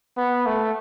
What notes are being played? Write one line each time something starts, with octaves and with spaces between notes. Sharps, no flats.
B3
A3